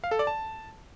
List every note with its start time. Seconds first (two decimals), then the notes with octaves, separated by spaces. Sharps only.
0.04 F5
0.11 A4
0.19 D5
0.27 A5